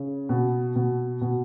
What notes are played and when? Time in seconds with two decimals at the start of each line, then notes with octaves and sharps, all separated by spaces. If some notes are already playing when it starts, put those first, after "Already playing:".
Already playing: C#3
0.29 B2
0.76 B2
1.21 B2